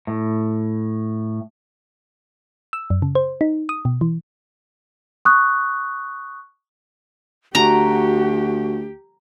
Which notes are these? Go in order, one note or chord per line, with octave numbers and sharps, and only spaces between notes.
A2
E6
F#2
C#3
C5
D#4
D#6
B2
E3
C#6 D#6 F#6
D2 F#4 G4 A#5